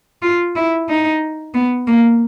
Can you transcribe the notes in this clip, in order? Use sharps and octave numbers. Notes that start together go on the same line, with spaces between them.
F4
E4
D#4
B3
A#3